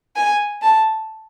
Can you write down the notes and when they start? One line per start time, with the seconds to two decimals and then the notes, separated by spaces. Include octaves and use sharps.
0.16 G#5
0.62 A5